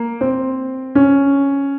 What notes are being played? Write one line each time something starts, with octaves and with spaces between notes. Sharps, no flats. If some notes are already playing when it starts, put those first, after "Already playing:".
Already playing: A#3
C4
C#4